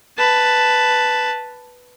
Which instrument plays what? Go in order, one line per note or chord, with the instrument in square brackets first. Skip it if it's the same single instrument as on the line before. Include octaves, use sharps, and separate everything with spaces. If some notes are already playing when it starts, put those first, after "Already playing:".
[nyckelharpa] B4 A5